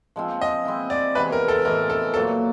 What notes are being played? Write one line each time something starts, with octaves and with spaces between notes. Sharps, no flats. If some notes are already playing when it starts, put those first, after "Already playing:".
F3 G#3 C4 F4
D#5
G#3 C4 E4
D5
C3 E3 G#3 B3 B4
A#4
A4
A2 E3 G#3 A#4
A4
A#2 F#3 A#3 A4